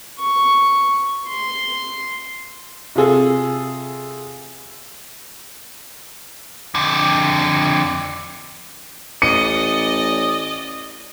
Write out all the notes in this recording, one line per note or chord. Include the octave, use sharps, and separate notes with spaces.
C#6
C6
C3 F4 G#4 A4
F2 D3
A1 D5 D#5 C#7 D#7